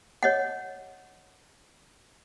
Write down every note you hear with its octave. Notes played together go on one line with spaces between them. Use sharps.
C#5 D#5 F#5